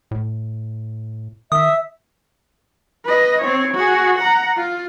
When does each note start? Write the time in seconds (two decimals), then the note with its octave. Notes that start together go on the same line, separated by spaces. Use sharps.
0.11 A2
1.52 D#3 E5 D#6
3.05 B4 D#5
3.41 C4 C#5
3.74 F#4 G#4
4.18 F#5 A#5
4.57 F4